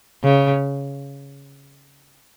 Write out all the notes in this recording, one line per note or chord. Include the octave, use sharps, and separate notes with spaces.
C#3